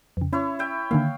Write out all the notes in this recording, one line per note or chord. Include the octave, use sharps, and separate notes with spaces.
F2 C#3
C#4 E4 C#5
E5 G5
D3 D#3 A#3 F5